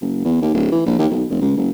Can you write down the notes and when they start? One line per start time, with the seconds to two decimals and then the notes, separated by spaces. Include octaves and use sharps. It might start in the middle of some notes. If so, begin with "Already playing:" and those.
0.01 F#1
0.24 E2
0.42 D#2
0.54 D1
0.72 E3
0.86 A#1
0.98 D#2
1.11 B1
1.30 F1
1.41 C#2
1.57 F#1